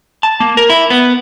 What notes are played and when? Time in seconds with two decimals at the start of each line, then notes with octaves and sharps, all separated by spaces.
0.23 A5
0.40 A#3
0.57 A#4
0.69 E4
0.90 B3